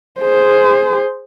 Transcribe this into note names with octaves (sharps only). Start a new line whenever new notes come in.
G#4 C5